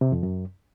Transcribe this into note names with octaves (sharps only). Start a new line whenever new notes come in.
C3
F2
F#2